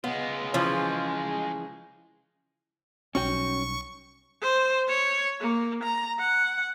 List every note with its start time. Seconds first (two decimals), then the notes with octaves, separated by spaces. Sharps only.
0.04 G#3 B3 F4
0.54 C#3 E3 F3
3.15 B1 G3 C#4 F#4 G5 C#6
4.42 C5
4.88 C#5
5.40 A#3
5.83 A#5
6.19 F#5